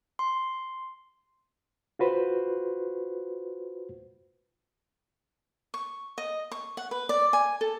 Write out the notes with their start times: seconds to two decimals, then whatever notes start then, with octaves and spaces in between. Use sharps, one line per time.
0.19 C6
1.99 F4 F#4 B4 C5
5.74 C#6
6.18 D#5
6.51 C#6
6.77 F#5
6.91 B4
7.09 D5
7.33 G#5
7.61 A4